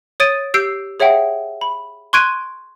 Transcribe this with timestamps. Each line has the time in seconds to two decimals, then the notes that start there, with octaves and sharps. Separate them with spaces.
0.20 C#5 D#6 A6 D7 D#7
0.54 G4 E6 G6 C7 D7
1.00 G#4 C#5 E5 F#5 G5
1.61 B5
2.13 C6 C#6 F#6 G#6 D7 D#7